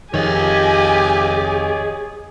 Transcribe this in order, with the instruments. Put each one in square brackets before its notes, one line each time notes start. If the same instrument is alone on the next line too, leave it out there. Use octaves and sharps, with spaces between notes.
[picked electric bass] F2 D#3 [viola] G4 G#5 [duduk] G#4 [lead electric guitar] C#5 D#5